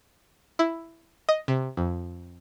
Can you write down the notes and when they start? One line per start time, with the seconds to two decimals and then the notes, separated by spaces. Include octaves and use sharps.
0.59 E4
1.29 D#5
1.48 C3
1.77 F2